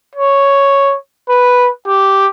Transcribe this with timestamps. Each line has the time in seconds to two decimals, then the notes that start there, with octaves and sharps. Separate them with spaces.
0.16 C#5
1.29 B4
1.87 G4